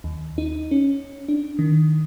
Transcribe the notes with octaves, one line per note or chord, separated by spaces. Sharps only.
D#2
D#4
C#4
D4
D#3